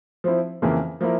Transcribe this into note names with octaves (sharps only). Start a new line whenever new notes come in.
F3 C4 E4
F2 C#3 E3 A#3
F3 A#3 E4 A#4